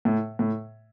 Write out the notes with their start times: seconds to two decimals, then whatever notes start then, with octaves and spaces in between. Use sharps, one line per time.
0.05 A2
0.39 A2